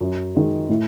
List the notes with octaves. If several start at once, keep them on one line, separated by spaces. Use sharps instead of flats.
F#2
D#3 G#3
A2